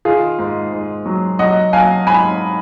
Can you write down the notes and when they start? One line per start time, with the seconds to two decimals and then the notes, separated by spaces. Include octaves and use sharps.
0.05 D#3 F4 G#4
0.39 G#2
0.72 G#2
1.06 F#3
1.39 F#3 D#5 F#5
1.73 F#3 F5 G#5
2.06 G#2 G#5 B5